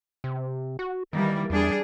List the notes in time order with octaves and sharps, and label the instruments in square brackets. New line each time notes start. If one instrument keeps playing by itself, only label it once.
[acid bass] C3
F#4
[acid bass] D#3 [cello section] E3 G3 A#3
[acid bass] E2 [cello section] G3 D4 G#4